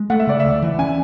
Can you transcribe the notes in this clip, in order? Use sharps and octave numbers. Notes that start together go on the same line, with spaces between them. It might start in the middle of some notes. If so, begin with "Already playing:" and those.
Already playing: G#3
A3 F#5
E5
C#3 D5
D2 E5
E3
C#4 G#5